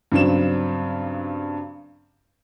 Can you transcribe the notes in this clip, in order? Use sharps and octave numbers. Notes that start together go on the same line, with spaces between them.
G2 C#3 F#3 C4 D4 E7